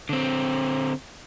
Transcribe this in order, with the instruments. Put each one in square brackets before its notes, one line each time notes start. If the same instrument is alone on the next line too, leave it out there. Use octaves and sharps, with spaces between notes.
[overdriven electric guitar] D3 C4